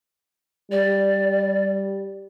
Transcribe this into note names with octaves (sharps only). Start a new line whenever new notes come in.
G3 D5